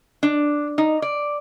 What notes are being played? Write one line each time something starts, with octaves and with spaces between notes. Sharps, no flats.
D4
D#4
D5